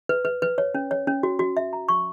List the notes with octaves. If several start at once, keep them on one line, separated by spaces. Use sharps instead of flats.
B4
B4
B4
C#5
C#4
C#5
C#4
F#4
F#4
E5
A#5
C#6